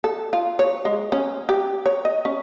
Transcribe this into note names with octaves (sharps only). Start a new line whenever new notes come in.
A4
F4
C#5
G#3
C#4
G4
C#5
D#5
C#4